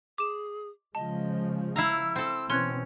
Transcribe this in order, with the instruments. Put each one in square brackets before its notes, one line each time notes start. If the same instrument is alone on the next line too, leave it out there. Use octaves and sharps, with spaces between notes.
[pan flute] G#4 [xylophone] D6 E7
[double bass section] C#3 F3 G#3 [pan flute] D#5 [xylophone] A5
[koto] E4 F5 A#5 [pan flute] E6
[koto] C4 A4
[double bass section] B2 E3 C4 [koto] C#4 [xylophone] C6 F#6 G#6